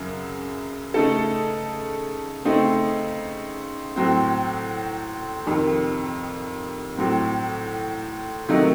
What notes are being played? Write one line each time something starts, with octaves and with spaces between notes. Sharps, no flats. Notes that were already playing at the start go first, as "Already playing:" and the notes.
Already playing: F#2 C#3 F#3
C#3 A3 D#4 A4
C#3 A3 C4 D#4
A2 F#3 C4
F2 C3 D#3
A2 F#3 C4
C3 D#3 F#3 A3 D#4